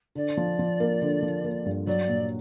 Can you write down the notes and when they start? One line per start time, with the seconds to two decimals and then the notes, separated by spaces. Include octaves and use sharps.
0.15 D3 D5
0.37 F3
0.59 F3
0.80 A#3
1.02 D3
1.22 F3
1.44 A#3
1.66 G2
1.87 F#3 D5
2.08 A#2